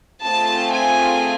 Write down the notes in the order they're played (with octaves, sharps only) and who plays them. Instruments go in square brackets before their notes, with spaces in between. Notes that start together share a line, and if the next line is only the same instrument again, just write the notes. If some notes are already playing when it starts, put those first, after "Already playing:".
[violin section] A3 C4 F4 G#4 A5
G#5